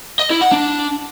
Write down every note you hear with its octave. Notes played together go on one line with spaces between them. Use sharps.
D#5
E4
F#5
D4